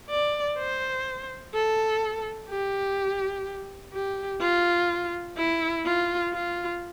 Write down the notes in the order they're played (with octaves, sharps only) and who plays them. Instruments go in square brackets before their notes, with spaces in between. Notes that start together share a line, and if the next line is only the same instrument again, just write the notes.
[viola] D5
C5
A4
G4
G4
F4
E4
F4
F4